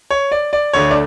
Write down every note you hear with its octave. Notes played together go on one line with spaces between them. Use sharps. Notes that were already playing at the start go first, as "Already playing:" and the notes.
C#5
D5
D5
D2 D3 A3 C#5
D4